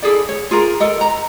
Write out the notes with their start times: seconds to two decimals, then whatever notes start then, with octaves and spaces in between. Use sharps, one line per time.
0.02 E4 G#4 A4 D5
0.29 C#5
0.51 F4 G#4 A#4
0.80 A4 A#4 D#5
1.01 A#5